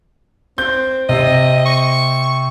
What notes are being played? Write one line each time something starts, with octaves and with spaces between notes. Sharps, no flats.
C4 G6
C3 D#5
C#6